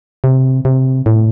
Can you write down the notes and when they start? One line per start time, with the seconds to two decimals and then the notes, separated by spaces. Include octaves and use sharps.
0.24 C3
0.65 C3
1.06 A2